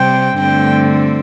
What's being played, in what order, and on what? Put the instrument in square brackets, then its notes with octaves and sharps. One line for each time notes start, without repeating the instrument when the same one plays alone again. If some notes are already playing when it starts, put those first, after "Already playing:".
Already playing: [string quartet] C3 G3 C4 G5
G2 D3 A3 C4 G5